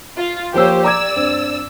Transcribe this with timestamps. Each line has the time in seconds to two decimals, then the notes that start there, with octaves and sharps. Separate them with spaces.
0.18 F4
0.54 F3 A#3 G4 C5 C#5 E6
0.84 D5 A#5 D6 E6 G#6
1.16 G2 C4